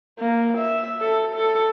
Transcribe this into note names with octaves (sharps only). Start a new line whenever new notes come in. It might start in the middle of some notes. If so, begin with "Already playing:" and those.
A#3
E5
A4
A4